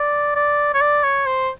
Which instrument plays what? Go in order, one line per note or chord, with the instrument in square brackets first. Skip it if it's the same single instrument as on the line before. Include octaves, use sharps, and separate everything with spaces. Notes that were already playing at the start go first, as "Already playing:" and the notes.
Already playing: [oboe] D5
D5
C#5
D5
C#5
C5